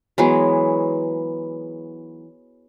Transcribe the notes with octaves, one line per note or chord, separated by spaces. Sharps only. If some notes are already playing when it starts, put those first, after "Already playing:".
E3 F#3 G#3 B3